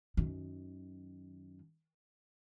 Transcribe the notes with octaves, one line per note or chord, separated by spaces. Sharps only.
F#2 D#3